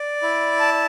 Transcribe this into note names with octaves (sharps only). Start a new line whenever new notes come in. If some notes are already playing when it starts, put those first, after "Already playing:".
Already playing: D5
E4
A5